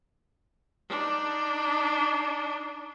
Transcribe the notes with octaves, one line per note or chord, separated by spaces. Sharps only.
D4 D#4